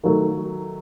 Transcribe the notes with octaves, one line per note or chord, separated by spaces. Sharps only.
D#3 F#3 A3